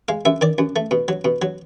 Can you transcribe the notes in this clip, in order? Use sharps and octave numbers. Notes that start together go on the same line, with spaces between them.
G#3 F5
F#2 E5
D#3 D5
F#2
A3
B2
F#3
B2
F#3